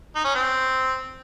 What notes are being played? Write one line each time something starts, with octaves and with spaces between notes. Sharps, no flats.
D#4
C#4
C4